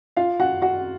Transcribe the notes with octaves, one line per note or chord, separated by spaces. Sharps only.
F4 F5
F#4 F#5
F#4 F#5